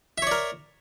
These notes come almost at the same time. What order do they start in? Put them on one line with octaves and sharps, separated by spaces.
E5 C#5 D5 A#4